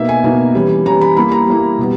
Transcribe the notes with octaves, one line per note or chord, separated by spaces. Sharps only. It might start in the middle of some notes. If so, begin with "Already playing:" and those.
Already playing: B2 A#3 D#4 E5
G#5
B2 A#3 D#4
E3 G3 C#4
E3 G3 C#4 A#5
B5
G3 A#3 E4 B5
A#5
G3 A#3 E4
B2 G3 B3